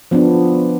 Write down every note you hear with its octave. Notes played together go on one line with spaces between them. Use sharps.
F3 B3 D4